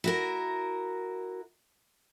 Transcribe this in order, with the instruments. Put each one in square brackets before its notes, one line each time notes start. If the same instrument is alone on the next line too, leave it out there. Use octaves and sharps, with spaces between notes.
[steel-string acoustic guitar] E4 F#4 A#4